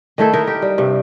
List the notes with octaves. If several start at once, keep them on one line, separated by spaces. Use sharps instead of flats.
D#3 A3 E4 A4
D#4 E4 A#4
G4
G3
G2 C3